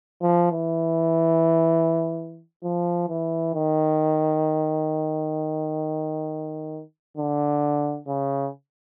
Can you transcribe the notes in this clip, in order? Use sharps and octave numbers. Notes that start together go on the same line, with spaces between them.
F3
E3
F3
E3
D#3
D3
C#3